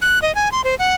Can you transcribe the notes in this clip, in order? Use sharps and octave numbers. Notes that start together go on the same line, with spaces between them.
F#6
D#5
G#5
C6
C5
F#5